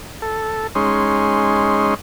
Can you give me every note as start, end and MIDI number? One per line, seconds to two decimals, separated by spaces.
0.22 0.67 69
0.75 1.94 56
0.75 1.94 61
0.75 1.94 63
0.75 1.94 84